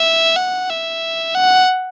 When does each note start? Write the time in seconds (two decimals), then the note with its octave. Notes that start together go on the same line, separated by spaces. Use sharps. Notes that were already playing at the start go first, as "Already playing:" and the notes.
Already playing: E5
0.36 F#5
0.70 E5
1.35 F#5